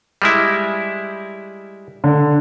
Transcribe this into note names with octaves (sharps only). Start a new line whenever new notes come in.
G3 G#3 E4
D3